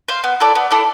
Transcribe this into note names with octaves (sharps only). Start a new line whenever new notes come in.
C5 F5
B3
E4 A4 D5
B3
E4 A4 D5